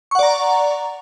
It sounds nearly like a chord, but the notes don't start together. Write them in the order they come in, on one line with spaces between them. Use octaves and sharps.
C#6 F#5 D5 A#5